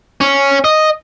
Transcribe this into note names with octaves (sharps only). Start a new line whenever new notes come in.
C#4
D#5